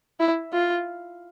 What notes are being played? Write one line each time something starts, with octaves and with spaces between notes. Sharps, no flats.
E4
F4